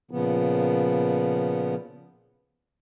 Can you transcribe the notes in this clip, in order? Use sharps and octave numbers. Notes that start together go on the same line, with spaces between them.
A#2 C#3 F3 B3